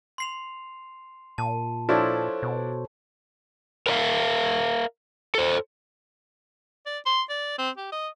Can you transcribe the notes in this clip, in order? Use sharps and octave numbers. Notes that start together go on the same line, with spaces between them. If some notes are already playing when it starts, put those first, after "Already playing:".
C6 C7 F7
A#2 A5
F3 D4 E4 A4 C5 C#5
B2
A#4 B4 D5 E5 F5
A4 C5
D5
C6
D5
C4
G4
D#5